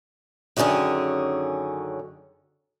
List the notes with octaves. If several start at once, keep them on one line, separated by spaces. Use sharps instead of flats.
F#2 D3 D#3 C#4 G#4